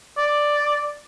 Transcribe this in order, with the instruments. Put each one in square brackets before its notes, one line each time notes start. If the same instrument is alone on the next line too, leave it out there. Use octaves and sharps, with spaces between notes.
[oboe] D5